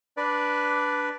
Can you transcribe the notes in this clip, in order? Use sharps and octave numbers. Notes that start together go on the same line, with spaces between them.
D4 B4 D5